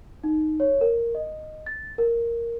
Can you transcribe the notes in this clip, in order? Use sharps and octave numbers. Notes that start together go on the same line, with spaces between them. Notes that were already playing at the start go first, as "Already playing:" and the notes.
D#4
C#5
A#4
D#5
A6
A#4